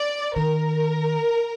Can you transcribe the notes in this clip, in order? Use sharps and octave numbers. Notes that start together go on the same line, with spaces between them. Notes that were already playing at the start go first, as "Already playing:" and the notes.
Already playing: D5
D#3 A#4